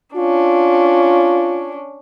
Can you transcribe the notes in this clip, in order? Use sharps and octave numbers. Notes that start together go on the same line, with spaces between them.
C#4 D4 F4